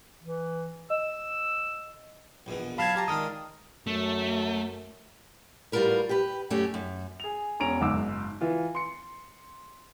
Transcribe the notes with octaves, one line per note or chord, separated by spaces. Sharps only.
E3
D#5 E6
A#1 E2 B2
F#3 F5 A5 B5 F6 G#6
F4 G4 A5 A#5
D#3 G#3 D4 D#6 F6
F#2 A3
A2 G3 F4 F#4 A#4 B4
G4 B4
F#2 F#3 A3 C#4 G4
F#2
G#4 F7
E1 C#4 A#5 D7 F7
F#1 G#2 D6 E6
E3 F4
C6 C#7